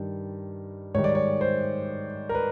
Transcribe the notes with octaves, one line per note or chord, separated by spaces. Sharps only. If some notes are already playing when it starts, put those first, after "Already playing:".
Already playing: G2 D#3 G3
G#2 D#3 G3 C#5
D5
C#5
C5
A#4
B4